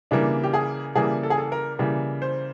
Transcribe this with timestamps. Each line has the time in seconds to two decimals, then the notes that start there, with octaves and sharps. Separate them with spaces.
0.11 C#3 E3 G3 A#3 D4
0.44 G4
0.54 G#4
0.95 C#3 E3 G3 A#3 G#4
1.23 A4
1.30 G#4
1.38 A4
1.52 A#4
1.79 C#3 E3 G3 A#3
2.22 C5